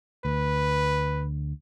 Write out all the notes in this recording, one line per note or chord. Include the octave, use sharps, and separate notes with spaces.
D2 B4